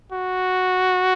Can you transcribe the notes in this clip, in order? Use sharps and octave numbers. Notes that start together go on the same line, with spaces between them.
F#4